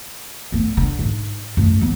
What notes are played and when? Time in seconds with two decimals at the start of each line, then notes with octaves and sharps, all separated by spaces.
0.52 A3 B3
0.77 D3
0.99 G#2
1.57 F#2 A3
1.81 F3 B3